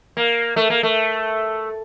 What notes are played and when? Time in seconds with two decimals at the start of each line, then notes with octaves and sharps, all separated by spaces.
0.17 A#3
0.56 A3
0.70 A#3
0.83 A3